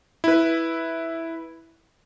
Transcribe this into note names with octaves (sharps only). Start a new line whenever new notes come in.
E4 B4